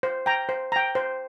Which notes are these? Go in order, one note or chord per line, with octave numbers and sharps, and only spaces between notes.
C5
G5 A#5
C5
G5 A#5
C5